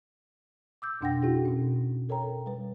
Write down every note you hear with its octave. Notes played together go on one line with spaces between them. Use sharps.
D6 E6 G6
F2 B2 D4 F#5 G5 A#6
D#4 E4 F#4 G#4
B2 C#4
A4 A#4 C#5 G5 A#5
G3 B4